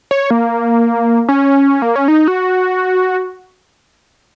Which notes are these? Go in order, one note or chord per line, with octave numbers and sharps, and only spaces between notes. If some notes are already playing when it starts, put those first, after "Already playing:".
C#5
A#3
C#4
A#3
C#4
D#4
F#4